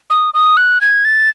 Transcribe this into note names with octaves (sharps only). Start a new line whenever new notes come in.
D#6
D#6
F#6
G#6
A6